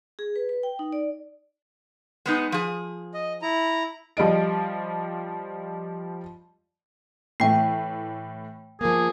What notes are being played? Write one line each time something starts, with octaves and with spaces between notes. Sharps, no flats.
G#4
B4
B4
G5
D#4
D5
G#3 B3 D#4
F3 G#4
D#5
E4 A#5
F3 G3 D5 D#5 D7
A2 E3 A3 G5 C7
F3 A#3 G#4